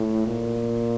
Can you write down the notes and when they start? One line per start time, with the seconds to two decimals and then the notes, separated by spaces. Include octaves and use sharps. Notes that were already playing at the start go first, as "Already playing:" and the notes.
Already playing: A2
0.27 A#2